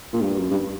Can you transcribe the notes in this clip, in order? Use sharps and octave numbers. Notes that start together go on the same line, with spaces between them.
A#2
G2
F#2
G2